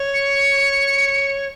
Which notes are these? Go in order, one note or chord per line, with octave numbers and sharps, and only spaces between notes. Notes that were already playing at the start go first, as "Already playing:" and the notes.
Already playing: C#5
C#7